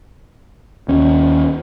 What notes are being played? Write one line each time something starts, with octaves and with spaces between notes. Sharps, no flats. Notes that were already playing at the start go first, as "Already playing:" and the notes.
D#2 C#4